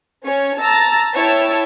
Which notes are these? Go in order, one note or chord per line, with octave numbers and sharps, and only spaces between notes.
C#4 C#5
A5 A#5 E6 A6
E4 C#5 G5 A5 E6